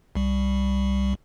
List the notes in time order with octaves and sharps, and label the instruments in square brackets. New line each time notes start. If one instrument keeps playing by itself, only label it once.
[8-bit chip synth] C2 G3